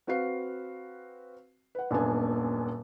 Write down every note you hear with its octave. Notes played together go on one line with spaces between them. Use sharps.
C4 F#4 B4 F5 C7
B4 F#5
D#1 F#2 A#2 B3 D4 G#5